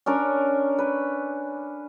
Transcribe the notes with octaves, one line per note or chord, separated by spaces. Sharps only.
C#4 D4 A#4
B4